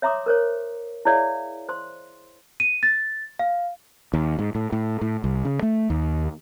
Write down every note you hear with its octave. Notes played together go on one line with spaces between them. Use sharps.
C#5 E5 A#5 C6 D6 D#6
A#4 C5 C#5
E4 G#4 C#5 D5 E5 F5
C5 C6
D#7
A6
F5
D#2
G#2
A2
A2
A2
C2
C#3
A3
D#2